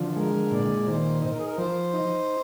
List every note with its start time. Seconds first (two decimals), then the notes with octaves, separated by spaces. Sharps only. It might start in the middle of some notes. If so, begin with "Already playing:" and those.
Already playing: D3 F3
0.16 G#3 A#4
0.52 A#2 D5
0.87 D#3 C5
1.22 D#4 C5
1.30 A#4
1.38 G#4
1.45 A#4
1.57 F3 C5
1.94 D#4